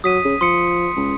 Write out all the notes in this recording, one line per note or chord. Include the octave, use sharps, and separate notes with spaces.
F#3 D#6 B6 D#7
C#3
F3 C6 D#6 C#7
C#2